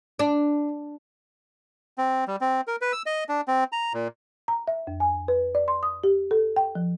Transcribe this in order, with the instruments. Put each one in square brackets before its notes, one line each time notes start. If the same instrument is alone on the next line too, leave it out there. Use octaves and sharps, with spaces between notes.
[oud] D4
[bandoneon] C4
G3
C4
A#4
B4
E6
D#5
D4
C4
A#5
A#2
[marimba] A#5
E5
F2
G#5
B4
D5
C6
D#6
G4
A4
G5
F3